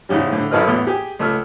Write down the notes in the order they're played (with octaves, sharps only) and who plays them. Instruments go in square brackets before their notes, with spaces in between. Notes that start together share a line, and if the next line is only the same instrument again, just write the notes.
[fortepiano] E2 G#2 C#3 G3
A2 D3
G#1 F#2 A4 B4 D#5 F6
E2 A2 B3
G4 G#4
C#2 A3 E6 F6